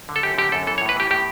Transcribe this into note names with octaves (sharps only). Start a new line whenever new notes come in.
D3
A4
F#2 G4
D3 G4
F#2 A4
E3 A4
C#5
A2
B4
E3 G4
A2 G4